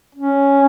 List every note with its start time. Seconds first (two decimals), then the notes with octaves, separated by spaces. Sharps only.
0.15 C#4